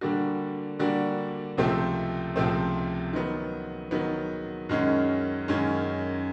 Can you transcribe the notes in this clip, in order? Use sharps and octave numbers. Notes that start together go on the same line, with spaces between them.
D3 G3 A#3 D4 F#4
D3 G3 A#3 D4 F#4
C#2 C3 F3 A3 C4
C#2 C3 F3 A3 C4
D#3 F#3 B3
D#3 F#3 B3
F#2 D#3 G#3 C#4
F#2 D#3 G#3 C#4